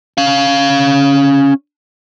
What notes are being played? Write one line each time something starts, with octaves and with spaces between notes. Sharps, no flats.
C#4 F5